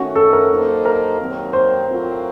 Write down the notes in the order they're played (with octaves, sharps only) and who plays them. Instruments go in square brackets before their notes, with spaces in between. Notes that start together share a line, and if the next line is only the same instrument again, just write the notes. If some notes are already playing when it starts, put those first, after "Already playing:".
Already playing: [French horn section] D#3 A3 C#4 [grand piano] F#4
[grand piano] A4
A#4
[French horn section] F#3 A#3 D#4 A4 C5
[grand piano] A#4
[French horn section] D#2 D#3 F#3 C4
[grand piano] C5
[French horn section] A2 F#3 C4 F4 A#4